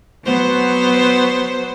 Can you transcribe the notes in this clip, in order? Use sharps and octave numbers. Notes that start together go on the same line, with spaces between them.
F#3 B3 C5